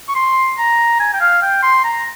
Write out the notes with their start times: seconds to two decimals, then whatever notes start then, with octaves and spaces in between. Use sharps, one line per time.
0.08 C#6
0.15 C6
0.58 A#5
0.99 G#5
1.13 G5
1.20 F5
1.42 G5
1.63 C6
1.84 A#5